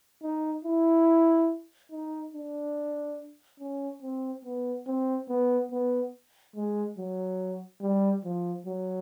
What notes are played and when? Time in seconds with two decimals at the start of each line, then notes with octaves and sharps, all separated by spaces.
0.23 D#4
0.65 E4
1.91 D#4
2.34 D4
3.59 C#4
4.02 C4
4.45 B3
4.87 C4
5.29 B3
5.71 B3
6.56 G#3
6.98 F#3
7.81 G3
8.24 F3
8.66 F#3